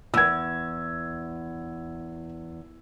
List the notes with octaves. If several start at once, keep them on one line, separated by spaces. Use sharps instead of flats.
E2 E6 G#6